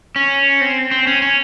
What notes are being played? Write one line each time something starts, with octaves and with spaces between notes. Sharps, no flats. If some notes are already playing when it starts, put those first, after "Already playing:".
C#4
C4
C4
C#4
C#4